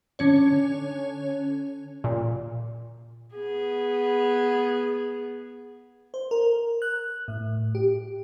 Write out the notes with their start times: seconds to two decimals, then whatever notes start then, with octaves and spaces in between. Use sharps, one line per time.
0.19 D3 C#4 C#5
2.04 A#2
3.35 B3 G#4
6.14 C5
6.31 A#4
6.82 F#6
7.28 A2
7.75 G4